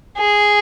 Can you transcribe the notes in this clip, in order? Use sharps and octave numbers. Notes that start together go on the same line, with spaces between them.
G#4